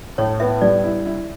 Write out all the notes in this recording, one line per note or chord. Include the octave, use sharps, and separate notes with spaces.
A2 C#5
B3 E5
G3 D5
E4
E4